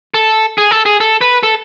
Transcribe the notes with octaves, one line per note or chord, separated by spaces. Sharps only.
A4
G#4
A4
G#4
A4
B4
A4